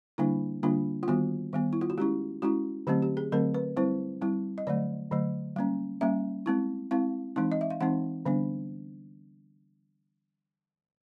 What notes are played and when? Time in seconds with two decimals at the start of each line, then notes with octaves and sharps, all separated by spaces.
0.18 D3 G3 A#3 D4 E4
0.63 D3 G3 A#3 D4 F4
1.03 F4
1.08 D#3 G3 B3 F#4
1.53 D#3 G3 B3
1.73 E4
1.81 F4
1.90 F#4
1.98 G#3 C#4 E4 G4
2.42 G#3 C#4 E4 F#4
2.87 D3 F#3 A3 C4 G4
3.02 G4
3.17 G#4
3.32 D3 F#3 A3 C4 A#4
3.54 B4
3.77 G3 C4 E4 C5
4.21 G3 C4 E4
4.58 D#5
4.67 D3 F#3 A3 D5
5.12 D3 F#3 A3
5.56 G3 A#3 C#4
6.01 G3 A#3 C#4 E5
6.46 G#3 C4 E4
6.91 G#3 C4 E4 F5
7.36 E3 G#3 C4 D#4
7.52 D#5
7.61 E5
7.70 F5
7.81 E3 G#3 C4 D#4 F#5
8.25 D3 G3 B3 D4